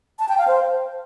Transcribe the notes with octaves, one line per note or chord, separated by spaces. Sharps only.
A5
G5
F5
C5